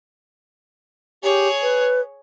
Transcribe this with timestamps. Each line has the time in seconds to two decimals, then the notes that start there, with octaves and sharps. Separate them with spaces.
1.23 G4 G#4 C#5
1.62 B4